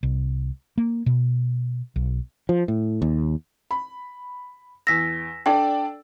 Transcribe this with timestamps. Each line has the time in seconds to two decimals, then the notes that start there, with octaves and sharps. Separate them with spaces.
0.03 C2
0.78 A#3
1.06 B2
1.96 B1
2.49 F3
2.68 A2
3.02 D#2
3.71 B5
4.87 E2 E6 A#6 B6
5.46 D4 A4 D5 G5